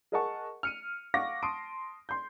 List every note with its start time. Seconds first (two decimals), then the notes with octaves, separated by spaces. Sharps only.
0.12 G#4 A#4 D#5 F#5 A5 C#6
0.63 F6 C#7 D#7
1.14 F5 F#5 C#6 D6 A#6
1.43 A5 C6 D#6 D7
2.09 C6 G6